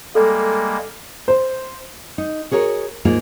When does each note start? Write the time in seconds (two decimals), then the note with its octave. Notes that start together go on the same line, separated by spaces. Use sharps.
0.15 G3 G#3 A#3 A4
1.28 C5
2.18 D#4
2.51 F#4 G#4 A#4 C#5
3.05 D#2 G#2 A#3 D#4 F4 G#4